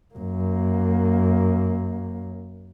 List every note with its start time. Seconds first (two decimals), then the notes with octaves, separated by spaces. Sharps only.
0.15 F#2 A#3